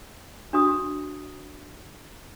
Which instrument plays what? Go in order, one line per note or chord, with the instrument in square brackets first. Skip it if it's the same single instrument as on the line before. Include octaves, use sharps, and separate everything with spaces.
[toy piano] D4 F#4 D#6